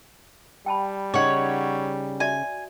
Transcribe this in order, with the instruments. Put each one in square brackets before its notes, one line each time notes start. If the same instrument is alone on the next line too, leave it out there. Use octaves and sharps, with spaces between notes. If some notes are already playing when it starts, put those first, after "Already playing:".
[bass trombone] G3 [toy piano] G5 A5 B5
[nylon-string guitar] C#3 D#4 [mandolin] C#5 F#5
[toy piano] F#4 D5 E5 [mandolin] G#5